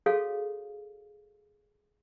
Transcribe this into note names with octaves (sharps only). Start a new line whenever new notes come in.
F#4 G#4 A4 C#5 F5